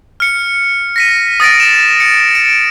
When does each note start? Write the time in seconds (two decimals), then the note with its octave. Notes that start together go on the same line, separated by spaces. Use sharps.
0.20 F6 C#7
0.96 A#6 B6 D#7
1.40 D#6 A6 A#6 D7
1.60 E7
2.00 C#7
2.35 D7